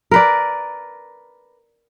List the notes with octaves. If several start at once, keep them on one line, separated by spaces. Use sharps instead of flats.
A#4 B4 D5